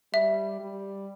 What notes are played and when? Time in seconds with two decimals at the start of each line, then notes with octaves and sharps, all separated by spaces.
0.13 G3 E5
0.60 G3